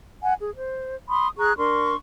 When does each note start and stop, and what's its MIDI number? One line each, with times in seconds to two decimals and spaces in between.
0.22 0.34 78
0.22 0.34 80
0.41 0.54 68
0.55 0.95 72
1.08 1.27 83
1.08 1.27 84
1.08 1.27 87
1.37 1.53 68
1.37 1.53 82
1.37 1.53 85
1.37 1.53 90
1.57 1.95 62
1.57 1.95 70
1.57 1.95 84
1.57 1.95 85